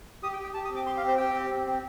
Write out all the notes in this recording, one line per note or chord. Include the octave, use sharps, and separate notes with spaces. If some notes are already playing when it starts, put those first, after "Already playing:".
G4 D#6
G5
G4
G5
G4 A5
D#6
C4
D6
G4 C6
F5
C4
C5
G4 G5
C4
C4
C4